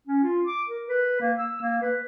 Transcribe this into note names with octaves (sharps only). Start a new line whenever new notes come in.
C#4
F4
D6
A#4
B4
A#3
E6
A#3
B4